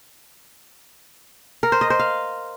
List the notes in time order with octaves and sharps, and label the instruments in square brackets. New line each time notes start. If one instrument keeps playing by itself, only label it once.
[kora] A#4
C5
D#5
C5
F5